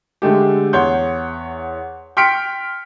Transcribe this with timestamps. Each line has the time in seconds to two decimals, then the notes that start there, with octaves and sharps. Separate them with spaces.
0.22 D3 G#3 A3 G4
0.73 E2 C#5 F#5 C6 G6
2.17 G5 C6 F6 B6 C#7 D7